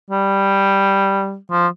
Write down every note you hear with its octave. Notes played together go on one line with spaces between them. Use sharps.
G3
F3